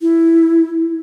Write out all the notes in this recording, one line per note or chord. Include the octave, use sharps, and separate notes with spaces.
E4